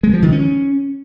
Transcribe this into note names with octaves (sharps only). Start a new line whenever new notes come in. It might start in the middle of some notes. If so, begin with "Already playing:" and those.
G#3
F3
D#3
C#4